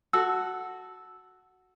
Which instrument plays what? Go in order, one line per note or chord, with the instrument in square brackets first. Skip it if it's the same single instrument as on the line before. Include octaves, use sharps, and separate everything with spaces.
[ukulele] F#4 A4 [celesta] E6